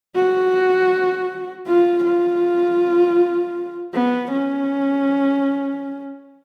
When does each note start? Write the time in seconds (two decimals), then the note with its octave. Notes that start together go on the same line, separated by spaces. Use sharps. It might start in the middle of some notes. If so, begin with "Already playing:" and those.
0.15 F#4
1.67 F4
2.05 F4
3.94 B3
4.31 C#4